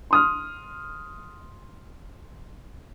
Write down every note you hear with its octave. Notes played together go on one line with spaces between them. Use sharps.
C6 D#6 F6